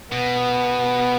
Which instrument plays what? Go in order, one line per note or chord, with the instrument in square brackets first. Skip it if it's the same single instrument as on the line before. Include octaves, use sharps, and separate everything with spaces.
[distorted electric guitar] B2 [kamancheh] B3